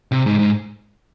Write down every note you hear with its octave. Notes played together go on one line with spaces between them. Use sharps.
C3
G#2
G#2